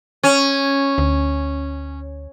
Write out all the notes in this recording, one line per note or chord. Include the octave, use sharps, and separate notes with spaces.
C#4
D2